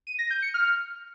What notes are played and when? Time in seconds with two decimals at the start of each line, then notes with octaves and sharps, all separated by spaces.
0.07 D#7
0.19 A#6
0.30 G6
0.42 C#7
0.54 F6